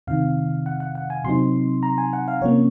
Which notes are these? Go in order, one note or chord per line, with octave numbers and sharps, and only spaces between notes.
F2 C3 D#3 F5
F#5
F#5
F#5
G#5
C3 F#3 C4 D#4 C6
A#5
G#5
F#5
F5
C3 F3 A#3 C#4 C#5